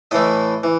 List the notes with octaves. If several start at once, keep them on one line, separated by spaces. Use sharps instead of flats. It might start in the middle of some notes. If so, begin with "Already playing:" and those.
A2 E3 A3 D#5
E3